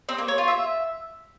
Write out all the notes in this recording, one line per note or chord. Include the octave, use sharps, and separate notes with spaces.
C4
A#3
C#5
F4
E5